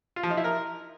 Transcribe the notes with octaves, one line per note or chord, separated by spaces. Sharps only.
F4
F3
D#4
E4
A#4